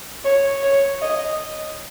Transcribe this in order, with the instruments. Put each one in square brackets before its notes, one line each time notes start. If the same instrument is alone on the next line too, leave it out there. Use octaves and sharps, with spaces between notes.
[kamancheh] C#5
C#5
D#5